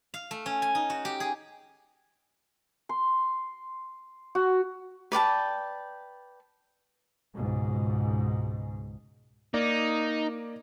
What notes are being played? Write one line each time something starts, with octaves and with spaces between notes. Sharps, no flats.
F5
A3
C#4
G#5
D#4
F#4
G4
G#4
C6
F#4
B4 D5 G5 A5
C#2 G#2 B2
A#3 D#4 D5